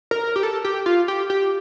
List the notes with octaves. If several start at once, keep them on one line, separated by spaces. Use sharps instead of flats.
A#4
G4
A4
G4
F4
G4
G4